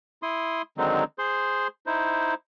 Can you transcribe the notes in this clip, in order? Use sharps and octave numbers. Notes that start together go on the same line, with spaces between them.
E4 C6 D#6
D3 D#3 F#3 G#3 C4 D#4
G#4 C5 C6
D#4 E4 C5